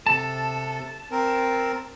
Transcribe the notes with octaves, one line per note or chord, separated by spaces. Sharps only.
C3 A4 A5
C4 A#4